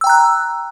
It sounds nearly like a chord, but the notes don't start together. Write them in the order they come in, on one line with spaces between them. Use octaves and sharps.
E6 G5 A#5 F#6